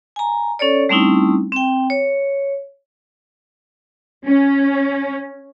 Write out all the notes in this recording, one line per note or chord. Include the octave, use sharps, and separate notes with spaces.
G#5 A#5
C#4 A4 C#5 D5
G3 A3 C4 C#4 D#4 E4
C4 G5
C#5
C#4